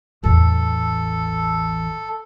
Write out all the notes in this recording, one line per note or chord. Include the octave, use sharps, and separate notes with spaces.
A1 E2 A4